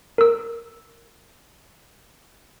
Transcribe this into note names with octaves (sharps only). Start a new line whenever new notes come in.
A#4 E6